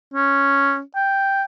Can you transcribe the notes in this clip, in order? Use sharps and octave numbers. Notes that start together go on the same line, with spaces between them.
C#4
G5